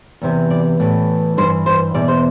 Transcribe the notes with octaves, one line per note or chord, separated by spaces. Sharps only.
E2 C3 E3
D5
A2 E3
G2 E3 C5
C5
E2 B2 D5
C5